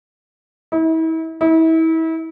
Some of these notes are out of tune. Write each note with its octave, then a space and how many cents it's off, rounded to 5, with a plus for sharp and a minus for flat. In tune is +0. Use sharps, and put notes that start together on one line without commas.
E4 -40
E4 -35